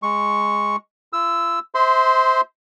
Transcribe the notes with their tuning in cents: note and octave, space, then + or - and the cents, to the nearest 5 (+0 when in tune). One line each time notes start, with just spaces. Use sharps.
G#3 +0 C#6 +0
F4 -45 E6 +0
C5 +0 E5 -35 C6 -20